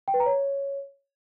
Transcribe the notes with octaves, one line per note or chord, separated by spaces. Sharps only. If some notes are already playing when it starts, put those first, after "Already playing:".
G5
B4
A#5
C#5